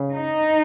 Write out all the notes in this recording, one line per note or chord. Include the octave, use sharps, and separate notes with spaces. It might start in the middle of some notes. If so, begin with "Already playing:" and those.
Already playing: C#3
D#4